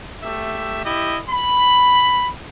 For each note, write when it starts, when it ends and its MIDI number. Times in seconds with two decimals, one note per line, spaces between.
0.22 0.85 57
0.22 0.85 67
0.22 0.85 76
0.85 1.18 64
0.85 1.18 67
0.85 1.18 75
1.30 2.30 83